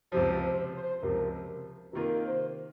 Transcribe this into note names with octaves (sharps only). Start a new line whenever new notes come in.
C#2 C3 F3 C5
C5
C5
C#2 C3 F3 A#4
C3 D#3 A#3 F4 A#4
C5